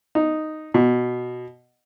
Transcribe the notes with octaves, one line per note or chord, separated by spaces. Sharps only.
D#4
B2